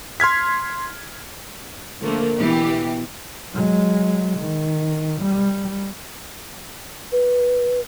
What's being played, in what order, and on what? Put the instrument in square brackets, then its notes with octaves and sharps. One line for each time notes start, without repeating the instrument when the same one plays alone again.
[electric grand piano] C6 F6 G#6 B6
[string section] D3 F3 A3 A#3
B2 E3 B3 G4
[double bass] F#3 G#3
D#3
G3
[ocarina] B4